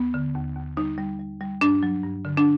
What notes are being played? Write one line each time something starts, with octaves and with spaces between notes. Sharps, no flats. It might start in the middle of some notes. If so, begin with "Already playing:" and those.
Already playing: D#2 B3
D3
D#2
D#2
G3 D#4
G3
G3
G3
G2 D4
F#3
G2
D3
D4